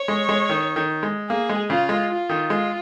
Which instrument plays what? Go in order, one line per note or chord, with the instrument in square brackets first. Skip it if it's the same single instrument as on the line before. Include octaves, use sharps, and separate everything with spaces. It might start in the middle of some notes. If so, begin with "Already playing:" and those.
Already playing: [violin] C#5
[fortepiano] G#3
G#3
D#3
D#3
G#3
[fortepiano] A#3 [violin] G#4
[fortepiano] G#3
[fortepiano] C#3 [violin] F4
[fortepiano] G#3
[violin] F4
[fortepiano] D#3
[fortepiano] G#3 [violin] F4